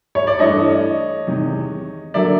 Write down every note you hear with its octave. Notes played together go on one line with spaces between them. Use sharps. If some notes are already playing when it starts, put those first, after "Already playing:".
C#5
D5
G2 E3 A3 C#5 D#5
E2 C3 D#3
D3 F#3 A#3 D5 E5